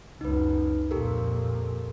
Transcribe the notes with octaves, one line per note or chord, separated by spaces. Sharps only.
C#2 F#2 D#4 B4
F2 A#2 G4 A4 A#4